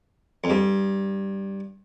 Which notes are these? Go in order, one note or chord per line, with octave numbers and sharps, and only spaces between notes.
F2
G2